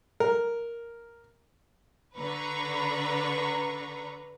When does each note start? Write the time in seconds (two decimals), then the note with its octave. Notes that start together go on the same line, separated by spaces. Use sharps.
0.20 A#4
2.18 D3 B4 A#5 C#6